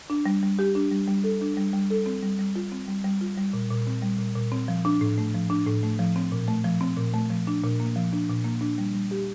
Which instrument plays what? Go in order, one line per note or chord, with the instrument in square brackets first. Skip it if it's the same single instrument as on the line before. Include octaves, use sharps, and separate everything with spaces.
[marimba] D4
G3
G3
G4
D4
G3
G3
A4
D4
G3
G3
A4
C4
G3
G3
F4
C4
G3
G3
F4
G3
A#2
A#2
C4
G3
A#2
A#2
C4
F3
D4
A2
A3
F3
D4
A2
A3
F3
C4
A#2
A3
F3
C4
A#2
A3
F3
D4
A#2
A#3
F3
D4
A#2
A#3
D4
G3
G3
G4